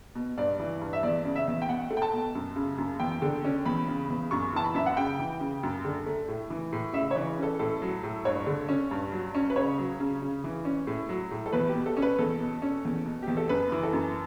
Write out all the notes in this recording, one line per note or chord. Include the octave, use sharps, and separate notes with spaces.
B2
G2 D5
E3
G2
E5
E2 D5
C#3
E5
E2
G5
B2 F#5
A3
G5
A5
B2
F#2
C#3
F#2
E2 G5
D3
C#4
E2 B5
C#3
E2
F#2 C#6
E3 A5
B5
F#2 E5
F#5
C#3 G5
E3
C#3
F#2
D3
A3
A2
E3
A2
C#3 E5
C#5
E3
C#4 A4
A2 A4
F#3
A2
G2 C#5
D3
C#4
G2
F#3
C#4
B4
C#3 C#5
F#3
C#3
C#3
E3
C#4
A2
F#3
A2
A4
E2 B4
G4
B2
A4
C#4
B4
E2 A4
B2
C#4
E2
B2
E2 G4
A4
F#2 B4
E3
A4
F#2